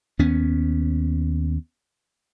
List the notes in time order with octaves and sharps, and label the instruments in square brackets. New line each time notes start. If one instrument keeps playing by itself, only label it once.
[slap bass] D#2 B3 C#4